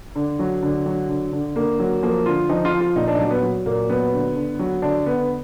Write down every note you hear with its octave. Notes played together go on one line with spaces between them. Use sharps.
D3
F#3
D3
F#3
D3
D3
D3 A#3
F#3
F3 A#3
D3 F4
F3 D#4
F4
F3
F4
A#2 D#4
D4
D#4
F#3 D4
B3
F#3
A#2 A#3
F#3 B3
D3
D3
F#3
D3 D4
D3 B3